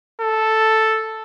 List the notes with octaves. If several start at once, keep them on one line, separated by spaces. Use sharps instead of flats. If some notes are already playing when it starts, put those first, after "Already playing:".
A4